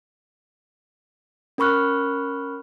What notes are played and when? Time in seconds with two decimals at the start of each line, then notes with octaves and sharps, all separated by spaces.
1.58 C#4 A#4 B5 C#6 F6 F#6